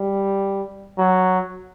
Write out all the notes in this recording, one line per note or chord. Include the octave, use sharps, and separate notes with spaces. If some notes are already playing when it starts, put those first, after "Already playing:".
Already playing: G3
F#3